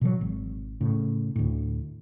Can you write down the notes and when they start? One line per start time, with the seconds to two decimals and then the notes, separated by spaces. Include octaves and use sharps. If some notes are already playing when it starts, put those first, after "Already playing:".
0.01 B2 E3 F#3
0.21 G#1
0.81 A2 C#3
1.36 D2 A2